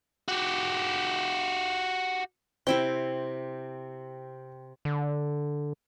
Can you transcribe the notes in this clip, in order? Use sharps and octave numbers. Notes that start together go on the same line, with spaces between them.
F#4 G4
C3 C4 E4 G5
D3